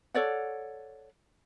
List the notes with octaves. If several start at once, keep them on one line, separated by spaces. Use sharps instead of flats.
A4 C#5 D5 F#5